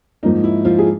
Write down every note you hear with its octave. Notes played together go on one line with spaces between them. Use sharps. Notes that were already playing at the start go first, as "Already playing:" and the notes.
G#2 F3 A#3 D#4
E4
F3 F4
G#4